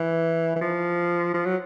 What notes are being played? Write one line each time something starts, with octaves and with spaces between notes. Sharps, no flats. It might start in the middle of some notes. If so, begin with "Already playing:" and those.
Already playing: E3
E3
F3
F3
F#3